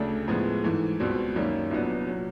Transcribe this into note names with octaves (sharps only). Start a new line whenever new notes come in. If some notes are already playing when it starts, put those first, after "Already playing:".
Already playing: D2 C#3 A3 D4
A2 F3 G#3 B3
G#2 E3 A3
C#2 B2 G3 C4
F#2 D#3 G3 A#3 C#4
C2 A#2 F#3 B3 D4
A#2 F#3